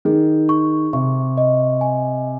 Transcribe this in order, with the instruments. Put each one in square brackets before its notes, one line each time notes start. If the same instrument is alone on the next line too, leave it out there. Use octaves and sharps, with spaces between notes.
[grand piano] D#3 [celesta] G#4
[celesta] C#6
[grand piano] C3 [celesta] C#6
[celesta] D#5
G#5